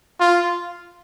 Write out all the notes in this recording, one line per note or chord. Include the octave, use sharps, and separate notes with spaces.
F4